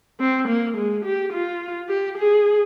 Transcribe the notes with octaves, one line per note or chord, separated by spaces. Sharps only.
C4
A#3
G#3
G4
F4
G4
G#4